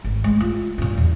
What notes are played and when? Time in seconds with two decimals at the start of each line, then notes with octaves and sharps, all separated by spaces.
0.04 G#1
0.24 G#3
0.40 F4
0.78 G2 A#2
0.98 E2